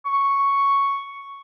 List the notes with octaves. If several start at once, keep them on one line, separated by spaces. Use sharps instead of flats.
C#6